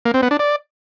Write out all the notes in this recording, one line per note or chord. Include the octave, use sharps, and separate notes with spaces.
A#3
C4
B3
D4
D5